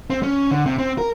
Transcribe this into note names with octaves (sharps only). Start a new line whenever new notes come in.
C4
C#4
D3
C3
C4
A#4